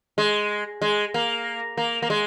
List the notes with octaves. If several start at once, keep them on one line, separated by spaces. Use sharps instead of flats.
G#3
G#3
A#3
A#3
A#3
G#3